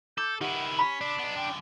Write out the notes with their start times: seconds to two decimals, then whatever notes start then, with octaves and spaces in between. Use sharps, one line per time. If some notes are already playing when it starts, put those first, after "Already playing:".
0.18 A4 D6 G6
0.41 D#3 D#4 E4 G4 B4 F#5
0.79 C#4 B5 B6
1.01 C3 D4
1.19 B3 D#4
1.36 F#2 D3 G5